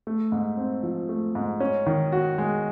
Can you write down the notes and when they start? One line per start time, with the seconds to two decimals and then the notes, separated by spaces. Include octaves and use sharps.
0.07 A3
0.32 G#2
0.57 C4
0.83 F3
1.09 A3
1.35 G#2
1.60 C#4
1.86 D#3
2.12 F#4
2.38 G#3